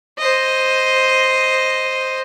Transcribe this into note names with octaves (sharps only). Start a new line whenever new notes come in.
C5 D#5